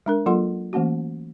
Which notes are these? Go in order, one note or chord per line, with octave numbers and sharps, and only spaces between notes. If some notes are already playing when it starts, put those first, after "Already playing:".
G#3 D4 A#4
F#3 A#3 F4 A4 F#5 C6
E3 A3 A#3 C#4 F#4